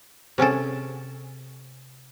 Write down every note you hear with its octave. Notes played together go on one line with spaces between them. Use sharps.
C3 C#4 G#4 A4